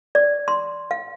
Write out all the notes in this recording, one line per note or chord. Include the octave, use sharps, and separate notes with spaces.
D5
C6
F5